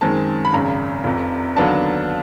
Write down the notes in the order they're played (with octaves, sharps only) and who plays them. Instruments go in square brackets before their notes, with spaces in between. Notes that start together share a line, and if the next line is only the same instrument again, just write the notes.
[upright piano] F#2 D#3 G#3 C4 A5
B5
G#1 F#2 C#3 A#5
F1 F2 C3
D#2 D3 F#3 B3 D4 A5